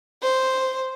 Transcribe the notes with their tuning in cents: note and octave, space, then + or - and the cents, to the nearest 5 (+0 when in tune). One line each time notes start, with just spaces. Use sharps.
C5 +0